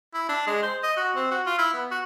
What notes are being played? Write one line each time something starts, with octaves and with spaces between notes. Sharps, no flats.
E4
D4
G#3
C5
D#5
F#4
C4
F#4
F4
E4
B3
F#4